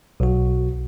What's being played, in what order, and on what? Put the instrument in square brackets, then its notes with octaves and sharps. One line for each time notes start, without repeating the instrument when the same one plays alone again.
[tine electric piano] B1 F#4